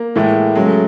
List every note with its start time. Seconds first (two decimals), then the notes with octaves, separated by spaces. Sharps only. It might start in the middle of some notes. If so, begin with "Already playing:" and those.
Already playing: A#3
0.15 A2 E3 G#3
0.55 C#3 F#3 G#3
0.66 A3